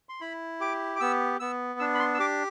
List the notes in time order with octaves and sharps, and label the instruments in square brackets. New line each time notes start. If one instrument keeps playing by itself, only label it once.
[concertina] C6
E4 B5
G4 D6
D6
B3 E6
B3 E6
D4 E6
B5
C6
E6
G4 D6